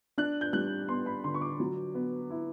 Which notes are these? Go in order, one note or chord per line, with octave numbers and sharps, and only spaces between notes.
D4 F#6
G6
G3 F#6
B3 C6
B5
D3 C6
C#6
D6
F#3
B3
E4